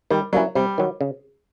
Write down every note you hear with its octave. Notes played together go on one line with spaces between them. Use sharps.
D#3 G3
F#3 G3 A#3 C#4 E4
C3 G3
D#3 F#3
C#3